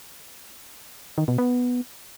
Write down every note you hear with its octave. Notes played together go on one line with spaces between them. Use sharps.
D#3
B2
B3